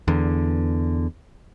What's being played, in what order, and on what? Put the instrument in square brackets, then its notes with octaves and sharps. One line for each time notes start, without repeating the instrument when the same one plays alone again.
[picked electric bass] E2 D3